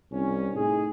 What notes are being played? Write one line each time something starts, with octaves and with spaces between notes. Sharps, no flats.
C2 C#4
A2 D#4 G#4